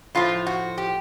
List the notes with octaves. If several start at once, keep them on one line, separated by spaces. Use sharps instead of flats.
A2 F3 F4
F#4
G4